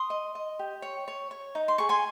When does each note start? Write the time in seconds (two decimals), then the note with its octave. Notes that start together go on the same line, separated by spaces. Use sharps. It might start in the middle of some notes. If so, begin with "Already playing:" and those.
Already playing: C6 D#6
0.10 D#5
0.35 D#5
0.59 G4
0.82 C#5
1.08 C#5
1.31 C#5
1.55 D#4
1.68 C6
1.78 G#4 C#6
1.89 G#5 C6